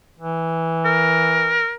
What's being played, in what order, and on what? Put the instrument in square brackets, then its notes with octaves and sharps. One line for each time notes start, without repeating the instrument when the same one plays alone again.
[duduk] E3
[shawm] A#4